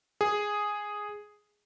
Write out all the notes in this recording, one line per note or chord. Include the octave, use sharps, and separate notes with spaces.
G#4